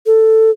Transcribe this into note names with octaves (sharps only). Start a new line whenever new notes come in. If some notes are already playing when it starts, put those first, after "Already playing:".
A4